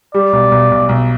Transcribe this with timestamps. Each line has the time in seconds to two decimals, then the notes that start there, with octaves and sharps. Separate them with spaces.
0.14 G3 D5
0.33 B1
0.51 B1
0.71 B1
0.89 B1